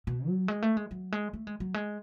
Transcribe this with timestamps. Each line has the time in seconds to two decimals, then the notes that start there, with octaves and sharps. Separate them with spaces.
0.07 B2
0.28 F#3
0.48 G#3
0.62 A3
0.77 G#3
0.91 F#3
1.12 G#3
1.33 A3
1.47 G#3
1.60 F#3
1.74 G#3